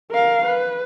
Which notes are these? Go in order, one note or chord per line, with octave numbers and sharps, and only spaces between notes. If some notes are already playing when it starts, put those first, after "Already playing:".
A#4 F5
B4